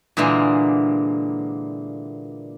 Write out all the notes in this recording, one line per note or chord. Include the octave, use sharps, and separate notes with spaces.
A#2 D3 E3 G#3 A#3